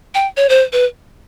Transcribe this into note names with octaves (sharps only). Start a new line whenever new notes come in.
G5
C#5
C5
B4